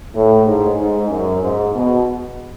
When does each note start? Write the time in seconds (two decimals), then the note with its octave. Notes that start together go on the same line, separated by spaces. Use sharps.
0.15 A2
0.47 G#2
0.79 G#2
1.11 F#2
1.43 G#2
1.75 B2